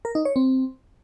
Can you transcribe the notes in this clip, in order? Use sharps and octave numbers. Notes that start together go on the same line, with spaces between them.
A#4
D#4
C#5
C4